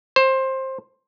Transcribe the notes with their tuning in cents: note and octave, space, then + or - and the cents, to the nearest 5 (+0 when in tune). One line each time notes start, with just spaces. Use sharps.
C5 +20